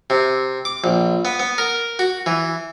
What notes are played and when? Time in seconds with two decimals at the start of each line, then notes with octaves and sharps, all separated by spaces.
0.10 C3
0.65 D6
0.84 A#1
1.25 B3
1.40 B3
1.58 A#4
1.99 F#4
2.26 E3